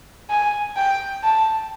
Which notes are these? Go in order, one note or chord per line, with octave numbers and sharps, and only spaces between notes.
G#5
G5
A5